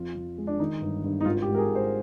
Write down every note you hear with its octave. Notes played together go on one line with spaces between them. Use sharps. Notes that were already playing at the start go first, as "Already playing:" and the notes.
Already playing: F2 F4
F2
G#3
D4
D#3 D#4
G1
G2
D#4
G#1 F4
G4
G#2
A#4
G#4
G#2
C5